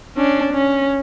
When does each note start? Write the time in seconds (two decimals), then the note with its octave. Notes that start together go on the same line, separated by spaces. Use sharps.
0.16 C#4 D4
0.53 C#4